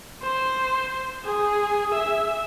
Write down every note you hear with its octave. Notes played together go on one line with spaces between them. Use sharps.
C5
G#4
E5